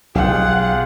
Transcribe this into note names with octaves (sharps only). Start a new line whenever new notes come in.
B1 F4 G4 G#4 F#5